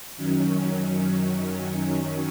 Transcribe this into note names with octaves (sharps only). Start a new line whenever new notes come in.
F#2 D#3 F#3 C#4